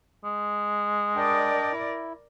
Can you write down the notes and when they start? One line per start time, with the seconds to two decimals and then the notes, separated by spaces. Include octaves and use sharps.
0.24 G#3
1.16 D4 A#4 D5 D#5 G5
1.72 E4